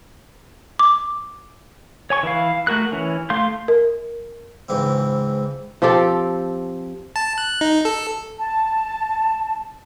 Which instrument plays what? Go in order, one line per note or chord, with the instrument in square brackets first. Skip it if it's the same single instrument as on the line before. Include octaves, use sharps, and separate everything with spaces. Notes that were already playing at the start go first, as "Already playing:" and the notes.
[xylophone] D6
[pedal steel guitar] C#5 G#5 C#6
E3 B4 F5
A3 F#4 A#4 F#6
E3 C#4
A3 F5 C6 G6
[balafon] A#4
[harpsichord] C#2 G#2 E3 C4
[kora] F3 C4 G4 A4
[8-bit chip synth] A5
F#6
D#4
A4
[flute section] A5